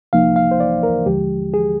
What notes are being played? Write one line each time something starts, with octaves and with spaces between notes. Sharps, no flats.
C2 C3 F3 A#3 D#4 F5
F5
C5
D5
A#4
D#2 D3 F3 G#3 G4
G#4